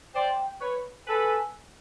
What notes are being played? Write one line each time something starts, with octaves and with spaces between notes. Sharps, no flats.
C5 D5 G5
B4 C#5
A4 B4 G#5